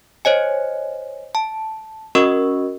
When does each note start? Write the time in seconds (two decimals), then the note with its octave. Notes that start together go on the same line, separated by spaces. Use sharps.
0.25 C5 C#5 D#5 G#5
1.35 A5
2.15 C#4 F#4 A#4 D#5 C#6 E6